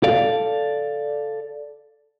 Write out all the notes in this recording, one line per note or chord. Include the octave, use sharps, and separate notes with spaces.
A4 D5 F5